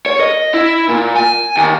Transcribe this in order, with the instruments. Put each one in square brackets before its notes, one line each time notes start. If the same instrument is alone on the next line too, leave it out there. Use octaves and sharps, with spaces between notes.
[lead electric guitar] C#5
D#5
E4
A#2
G#5
D#2